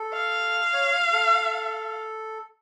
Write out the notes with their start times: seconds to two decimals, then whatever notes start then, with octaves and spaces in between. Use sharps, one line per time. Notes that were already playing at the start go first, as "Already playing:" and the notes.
Already playing: A4
0.13 F5
0.73 C#5
1.13 A4